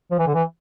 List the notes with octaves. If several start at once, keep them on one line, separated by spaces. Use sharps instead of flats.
F3
E3
D3
E3